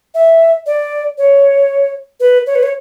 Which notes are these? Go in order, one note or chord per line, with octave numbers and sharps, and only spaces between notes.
E5
D5
C#5
B4
C#5
B4
C#5